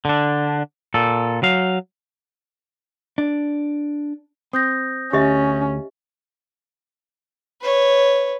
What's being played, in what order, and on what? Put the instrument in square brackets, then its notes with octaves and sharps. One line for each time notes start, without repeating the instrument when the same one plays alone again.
[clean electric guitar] D3 D4
A#2 A4
F#3 F5
[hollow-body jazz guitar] D4
[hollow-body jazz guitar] C4 [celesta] D#6 G6 A#6
[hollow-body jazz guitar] D2 [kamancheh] C#4 [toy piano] G4 D#5 E5
[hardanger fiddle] B4 C#5